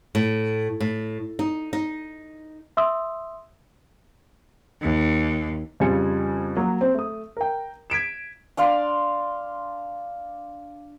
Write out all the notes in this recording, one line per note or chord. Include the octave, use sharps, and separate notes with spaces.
A2
A2
D#4
D#4
E5 C6 D#6 E6
D#2
F2 C#3 G3 F4 G#5 C#7
F#3 A#3
C4
A3 D#6
A#4 G5
G#6 B6 D7 E7
D4 D5 F5 C6